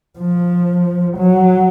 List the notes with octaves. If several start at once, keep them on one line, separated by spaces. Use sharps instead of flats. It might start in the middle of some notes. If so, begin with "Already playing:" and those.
F3
F#3